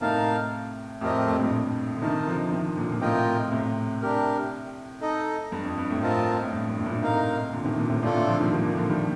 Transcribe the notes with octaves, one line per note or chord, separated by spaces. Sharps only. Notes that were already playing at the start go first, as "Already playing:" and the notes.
A2 C3 D#4 A#4 F5 A5
F2 A2 A3 C4 G4 A#4 D#5
F2 A2
G2 A#2
D3
C3 D#3 D#4 A#4 D#5 A5
D3 F3
C3 D#3
A#2 D3
A#2
A2 C3 F4 A#4 D#5 G5
A2 C3
D4 G4 A#4
D#4 A4 D#5
G2
F2
G2
F2 A2
C4 F4 A#4 D#5 A5
A2
G2
G2
A2
G2 A#2
A2 C3 D#4 A#4 F5
A#2 D3
C3 D#3
A#2 D3
A2 C3
A2 C3 A3 D4 F4 A4
A#2 D3
D3 F3
D#3 G3
G3 A#3
A#2 D3
D3 F3
D#3 G3